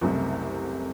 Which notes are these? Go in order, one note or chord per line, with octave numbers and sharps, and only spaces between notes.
F#1 C2 C3 A3